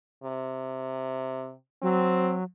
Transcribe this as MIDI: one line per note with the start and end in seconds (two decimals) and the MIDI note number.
0.24 1.54 48
1.82 2.43 54
1.82 2.36 60